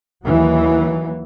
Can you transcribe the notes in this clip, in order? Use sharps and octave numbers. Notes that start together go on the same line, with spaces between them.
D#2 E3 F#3